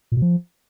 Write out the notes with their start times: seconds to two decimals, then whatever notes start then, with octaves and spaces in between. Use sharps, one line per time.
0.12 A#2
0.17 B2
0.22 F3